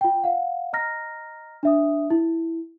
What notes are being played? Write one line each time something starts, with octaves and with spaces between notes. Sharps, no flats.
F4 G5
F5 F#5
D#5 A#5 F6 A#6
D4 E5 D#6
E4